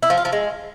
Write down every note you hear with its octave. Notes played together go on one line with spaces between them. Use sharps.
E4
F3
F4
F3
G#3